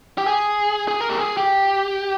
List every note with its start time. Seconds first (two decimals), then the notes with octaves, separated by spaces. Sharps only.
0.18 G4
0.26 G#4
0.88 G#4
1.00 A#4
1.09 G4
1.19 G#4
1.37 G4